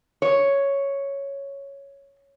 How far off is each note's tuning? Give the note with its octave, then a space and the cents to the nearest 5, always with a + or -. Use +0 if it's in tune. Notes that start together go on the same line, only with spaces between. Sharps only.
C#5 +0